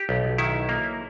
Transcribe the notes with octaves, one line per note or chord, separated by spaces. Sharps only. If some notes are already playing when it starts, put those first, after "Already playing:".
Already playing: G4
B1
D#3 E4
A#3